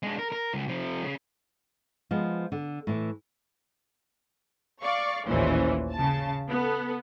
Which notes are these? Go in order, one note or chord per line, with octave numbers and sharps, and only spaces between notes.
G#3 D4
A#4
A#4
C#2
C3 F3
C#3
F3 G#3 B3
D3
A2 E3
D5 F5 C#6
A1 D#2 A#2 E3 C#4 C5
C#3 A5
B3 A4